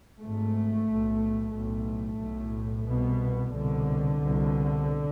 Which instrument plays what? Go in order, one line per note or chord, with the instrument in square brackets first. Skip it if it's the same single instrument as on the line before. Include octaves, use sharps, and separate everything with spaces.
[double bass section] G#1 G#2 A3
B1 A2
B1 A2 A3
B1
A2
C2 B2 B3
C2 B2 D3
C2 B2